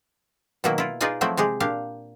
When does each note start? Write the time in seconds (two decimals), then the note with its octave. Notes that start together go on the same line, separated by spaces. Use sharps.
0.64 B2 D#3 F#3 A#3 E4
0.78 E4 F4
1.01 D#4 F4 G#4 B4 D5 G#5
1.21 F3 F#3 A3 C4 E4
1.37 C3 G#3 G4 G#4
1.60 A#2 D4 G4 F5